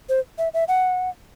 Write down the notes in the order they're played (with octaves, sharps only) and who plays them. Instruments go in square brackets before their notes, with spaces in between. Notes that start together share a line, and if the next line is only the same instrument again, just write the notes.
[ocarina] C5
E5
E5
F#5